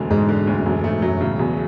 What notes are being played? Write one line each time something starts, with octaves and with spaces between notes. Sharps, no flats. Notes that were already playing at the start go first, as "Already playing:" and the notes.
Already playing: E1 D2 D3 G#3
G#2 G#3
D3
G#2
D2
F#2
E1
G#2 A3
F#2 F#3
A2 C#3
E2 B2